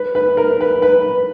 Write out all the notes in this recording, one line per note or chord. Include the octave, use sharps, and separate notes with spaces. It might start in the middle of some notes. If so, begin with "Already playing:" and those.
Already playing: B4
B4
A#4
B4
B4